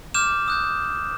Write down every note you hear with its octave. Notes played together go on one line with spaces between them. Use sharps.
D6 F6 G6 E7
D#6 F#6 G6